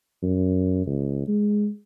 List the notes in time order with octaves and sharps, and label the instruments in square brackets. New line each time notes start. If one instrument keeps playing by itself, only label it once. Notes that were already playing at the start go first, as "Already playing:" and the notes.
[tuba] F#2
C#2
G#3